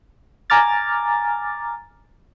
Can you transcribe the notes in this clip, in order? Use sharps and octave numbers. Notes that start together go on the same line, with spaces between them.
G#5 A#5 D6 F6 A6